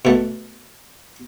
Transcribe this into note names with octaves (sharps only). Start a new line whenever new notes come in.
B2 A3